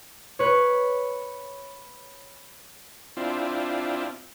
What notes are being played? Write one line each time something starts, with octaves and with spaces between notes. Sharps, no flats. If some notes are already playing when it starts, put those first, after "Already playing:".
B4 C#5
C4 D4 E4 F4